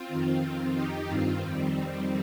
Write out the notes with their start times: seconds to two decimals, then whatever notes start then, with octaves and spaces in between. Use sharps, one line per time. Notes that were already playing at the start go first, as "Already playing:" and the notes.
Already playing: C4 F4
0.09 F2 D#3
0.41 D#3
0.47 F2
0.74 F2 D#3 D#4 G4
1.07 G2 D#3 C4 F4
1.40 F2 D#3 G3 C4
1.73 F2 D#3